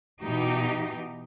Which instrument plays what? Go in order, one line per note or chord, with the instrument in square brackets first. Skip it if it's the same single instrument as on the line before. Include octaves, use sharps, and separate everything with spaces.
[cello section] B2 E3 D#4 G4